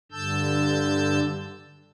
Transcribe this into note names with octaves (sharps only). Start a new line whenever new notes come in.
G2 D3 A5 E6 G6